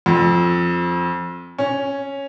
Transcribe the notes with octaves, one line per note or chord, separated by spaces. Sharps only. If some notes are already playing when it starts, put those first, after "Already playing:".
F2
C#4